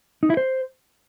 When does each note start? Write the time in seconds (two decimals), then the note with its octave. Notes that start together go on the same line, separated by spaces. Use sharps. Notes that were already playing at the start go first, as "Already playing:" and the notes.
0.23 D#4
0.30 E4
0.37 C5